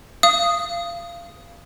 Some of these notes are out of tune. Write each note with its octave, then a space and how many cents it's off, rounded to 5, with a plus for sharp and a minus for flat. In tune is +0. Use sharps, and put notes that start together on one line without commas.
F5 -25 D#6 +0